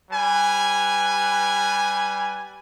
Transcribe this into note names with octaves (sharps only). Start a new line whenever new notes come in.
G3 B4 G#5